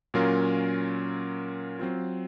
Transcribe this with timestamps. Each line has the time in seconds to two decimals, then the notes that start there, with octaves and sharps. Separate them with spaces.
0.14 A#2 F#3 C#4 F4 A#4
1.79 F#3 C4 F4